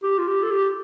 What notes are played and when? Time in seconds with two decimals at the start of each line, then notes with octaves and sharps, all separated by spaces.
0.03 G4
0.18 F4
0.28 G4
0.43 A4
0.51 G4